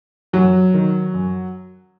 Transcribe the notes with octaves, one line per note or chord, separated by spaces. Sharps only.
F#2 F#3
D#3
F#2